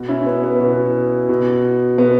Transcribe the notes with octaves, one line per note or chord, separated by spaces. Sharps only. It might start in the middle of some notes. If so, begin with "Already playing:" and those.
Already playing: B2
C#4 E4
B3
B3
B2
B2
B2 B3